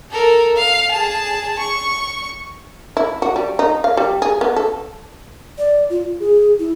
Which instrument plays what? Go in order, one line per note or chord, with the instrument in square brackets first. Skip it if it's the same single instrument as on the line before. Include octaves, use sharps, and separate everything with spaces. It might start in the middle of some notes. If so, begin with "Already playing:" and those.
[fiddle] A4 A#4
F5
G#4 A5
C#6
[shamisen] E4
F#4
G3
D#4
F5
G3
G#4
B3
A4
[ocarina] D5
F4
G#4
E4